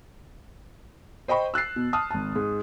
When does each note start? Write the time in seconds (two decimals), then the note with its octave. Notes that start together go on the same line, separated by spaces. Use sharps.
1.28 C5 D#5 G5 B5 C#6
1.54 E6 F#6 A6 C7
1.76 B2
1.93 A5 D#6 F6
2.10 G#1 A5
2.36 G#2